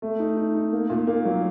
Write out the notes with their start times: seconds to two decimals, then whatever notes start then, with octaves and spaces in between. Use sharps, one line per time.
0.02 A3
0.20 D#4
0.37 D#4
0.55 D#4
0.73 A#3
0.90 A#2
1.07 A#3
1.25 F#3